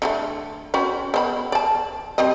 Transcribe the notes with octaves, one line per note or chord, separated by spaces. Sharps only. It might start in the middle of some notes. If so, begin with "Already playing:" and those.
D3 F#3 A3
C4 C#4 F#4
B3 C5 B5
D5 A5
G3 C4 D#5